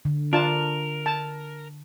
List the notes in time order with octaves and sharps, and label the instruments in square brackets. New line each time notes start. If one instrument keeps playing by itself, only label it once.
[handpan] D3
[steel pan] D4 F4 A5 [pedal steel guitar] A#4
[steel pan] A5